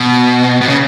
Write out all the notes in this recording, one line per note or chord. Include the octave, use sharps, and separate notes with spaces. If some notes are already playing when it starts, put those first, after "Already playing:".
Already playing: B2
B2
C#3